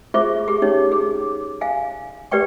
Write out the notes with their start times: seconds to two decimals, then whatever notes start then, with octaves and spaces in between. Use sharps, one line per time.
0.14 F4 G#4 C5 E5 C#6
0.48 G4 G#4
0.62 C#4 D#4 C#5
0.92 G#4
1.61 F5 G#5
2.31 G4 B4 D5 G5 C#6